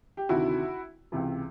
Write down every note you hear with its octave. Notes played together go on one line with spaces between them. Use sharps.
G4
D2 C3 D#3 E4 F#4
C#2 C3 E3